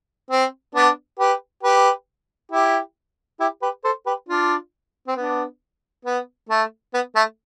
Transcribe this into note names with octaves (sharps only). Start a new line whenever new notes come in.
C4
B3 D4
G4 B4
G4 B4
E4 G4
E4 G4
G4 B4
A4 C5
G4 B4
D4 F4
C4
B3 D4
B3
A3
B3
A3